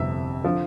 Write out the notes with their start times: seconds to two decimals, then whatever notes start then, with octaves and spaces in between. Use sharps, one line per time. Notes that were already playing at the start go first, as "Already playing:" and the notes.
Already playing: G1 F2 C3 E5
0.44 D3 F3